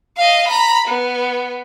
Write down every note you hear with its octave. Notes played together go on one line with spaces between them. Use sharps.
D#5 F5
A#5 B5
B3